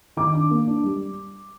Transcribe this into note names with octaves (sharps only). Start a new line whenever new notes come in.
D#3 D6
D4
A#3
D4
G3